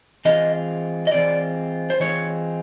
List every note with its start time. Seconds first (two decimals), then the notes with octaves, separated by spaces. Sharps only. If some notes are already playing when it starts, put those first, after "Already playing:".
0.25 E3 G#3 C4 F4 D#5
1.07 D#5
1.12 E3 G#3 C4 F4 D5
1.90 C5
2.00 E3 G#3 C4 F4 C#5